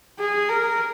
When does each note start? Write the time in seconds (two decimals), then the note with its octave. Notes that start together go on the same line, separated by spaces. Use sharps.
0.19 G#4
0.49 A#4